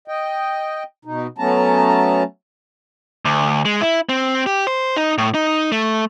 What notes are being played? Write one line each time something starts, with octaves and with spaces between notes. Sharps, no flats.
D#5 G5
B2 D#4
F#3 A3 B3 C#4 A5 A#5
D2
G#3
E4
C4
G4
C5
D#4
A2
D#4
A3